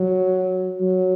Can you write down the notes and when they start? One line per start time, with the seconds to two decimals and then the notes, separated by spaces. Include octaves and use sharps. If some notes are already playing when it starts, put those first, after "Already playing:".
Already playing: F#3
0.81 F#3